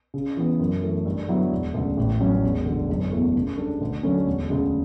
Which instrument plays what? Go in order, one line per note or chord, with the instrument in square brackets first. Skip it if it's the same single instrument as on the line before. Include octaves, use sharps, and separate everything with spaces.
[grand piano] C#3
E3 B3
F#2
E3 A3
G2
D3 F#3 B3 E4
E1
D2 C#3
A1
G2 F#3 C#4
E1
D2 D3
F#1
E2 B2 A3 E4
C#3
G3 D4 A4
D2
D3 F#3 A3 C#4
E1
D2 C#3